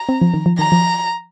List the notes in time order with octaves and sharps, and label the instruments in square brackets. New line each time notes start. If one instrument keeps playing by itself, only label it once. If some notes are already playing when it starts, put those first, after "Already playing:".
Already playing: [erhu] A#5
[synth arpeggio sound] C4
F3
D#3
F3
[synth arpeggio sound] D#3 [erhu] A#5
[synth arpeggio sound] F3